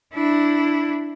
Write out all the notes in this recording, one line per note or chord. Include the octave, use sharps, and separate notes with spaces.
D4 E4